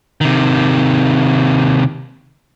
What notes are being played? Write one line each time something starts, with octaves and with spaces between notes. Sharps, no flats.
C3 D#3